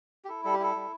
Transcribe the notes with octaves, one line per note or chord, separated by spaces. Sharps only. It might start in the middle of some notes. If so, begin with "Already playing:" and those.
G4
E4 A4
G3 A4
G4
E4 A4
G3